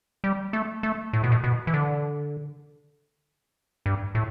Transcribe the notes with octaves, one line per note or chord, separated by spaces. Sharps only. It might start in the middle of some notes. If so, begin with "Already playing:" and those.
G3
A3
A3
A2
B2
A2
B2
E3
D3
G2
A2